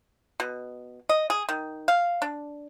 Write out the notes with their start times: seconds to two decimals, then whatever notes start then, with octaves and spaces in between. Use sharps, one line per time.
0.40 B2
1.09 D#5
1.30 G#4
1.49 D#3
1.88 F5
2.22 D4